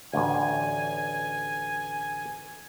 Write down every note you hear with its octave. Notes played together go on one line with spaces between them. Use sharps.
A1 D2 G#5